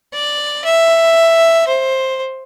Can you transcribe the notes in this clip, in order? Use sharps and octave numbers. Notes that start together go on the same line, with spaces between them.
D5
E5
C5